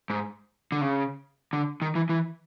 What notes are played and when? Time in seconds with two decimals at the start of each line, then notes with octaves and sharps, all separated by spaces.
0.10 G#2
0.72 D3
0.81 C#3
1.53 D3
1.82 D#3
1.95 E3
2.09 E3